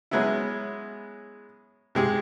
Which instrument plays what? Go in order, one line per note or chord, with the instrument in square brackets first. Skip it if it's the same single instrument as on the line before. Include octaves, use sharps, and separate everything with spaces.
[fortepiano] F#3 G#3 B3 C#4 E4
C3 G#3 G4